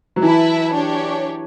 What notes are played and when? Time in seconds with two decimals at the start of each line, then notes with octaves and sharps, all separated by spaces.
0.16 F#3
0.22 E3 E4 B4 E5 A5
0.75 D4 G4 C#5